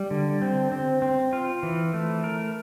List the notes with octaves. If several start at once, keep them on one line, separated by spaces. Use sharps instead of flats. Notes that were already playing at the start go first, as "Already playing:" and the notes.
Already playing: G3
D3
C4
C4
C4
F4
E3
A3
A#4